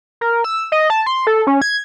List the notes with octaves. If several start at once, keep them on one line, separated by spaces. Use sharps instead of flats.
A#4
E6
D#5
A5
C6
A4
C#4
G#6